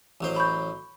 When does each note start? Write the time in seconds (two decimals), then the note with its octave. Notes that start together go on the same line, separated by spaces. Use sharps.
0.21 A1 F#3 C5
0.36 B5 C#6 G6